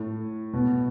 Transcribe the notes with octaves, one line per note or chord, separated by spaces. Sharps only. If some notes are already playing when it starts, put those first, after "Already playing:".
Already playing: A2
B2